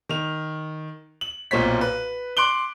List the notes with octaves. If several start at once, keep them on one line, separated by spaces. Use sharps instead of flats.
D#3 F7
F#7
B1 A#2 C4 C#5 B6
B4
C6 D6 F#6 D7 F#7 G7